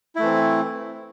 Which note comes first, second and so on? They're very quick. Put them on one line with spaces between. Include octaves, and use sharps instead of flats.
E4 A3 E3 C4